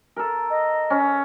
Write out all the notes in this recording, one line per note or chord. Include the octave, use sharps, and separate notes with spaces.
A4 A#4
D#5
C#4